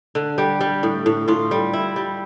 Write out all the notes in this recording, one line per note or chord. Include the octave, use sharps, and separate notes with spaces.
D3
G3 G4
G3
A2
A2
A2 F4
G3
E4
G3